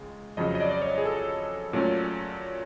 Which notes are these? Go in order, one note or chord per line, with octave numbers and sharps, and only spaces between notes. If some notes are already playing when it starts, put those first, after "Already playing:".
Already playing: C#2 G#3
F2 C#3 F#3 D#5
D#5
D5
D5
C#5
G#4
A4
A#2 F#3 A3 C#4